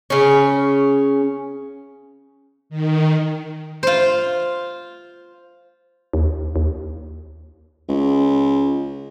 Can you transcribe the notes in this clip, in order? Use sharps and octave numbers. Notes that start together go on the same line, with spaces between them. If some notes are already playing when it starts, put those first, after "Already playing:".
C#3 C#4
D#3
F4 C5
D#2
D#2
C#2